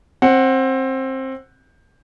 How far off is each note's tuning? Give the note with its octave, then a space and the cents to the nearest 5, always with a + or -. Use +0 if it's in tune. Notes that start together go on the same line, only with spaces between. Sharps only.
C4 +20 F#5 +0